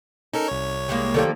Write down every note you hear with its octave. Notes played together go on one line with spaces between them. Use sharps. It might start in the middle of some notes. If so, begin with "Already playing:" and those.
C#4 D#4 A4 A#4
C2 C#5
G3 G#3 A#3
D#3 F3 A#3 G4 A4 D5